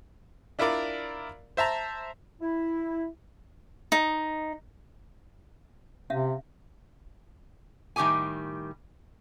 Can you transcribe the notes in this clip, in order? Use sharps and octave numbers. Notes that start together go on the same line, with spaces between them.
D4 E4 F4 A#4 D5
C5 E5 A5 A#5
E4
D#4
C3 C#4 E5 F5
A2 D#3 G3 G4 G#4 G#5